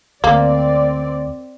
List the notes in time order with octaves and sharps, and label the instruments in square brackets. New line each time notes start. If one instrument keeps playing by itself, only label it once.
[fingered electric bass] D2 [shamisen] A#3 [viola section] C4 D5